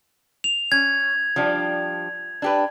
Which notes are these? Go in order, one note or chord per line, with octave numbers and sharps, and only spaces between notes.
F7
C#4 G#6
F3 G3 D4
D4 G4 B4